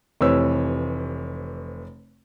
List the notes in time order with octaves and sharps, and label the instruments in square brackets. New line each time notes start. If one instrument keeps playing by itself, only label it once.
[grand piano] F1 C3 E3 B4 C#5 E6